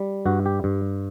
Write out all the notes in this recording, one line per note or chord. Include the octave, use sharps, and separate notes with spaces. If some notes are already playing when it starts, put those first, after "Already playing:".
Already playing: G3
G2 F#4
G4
G2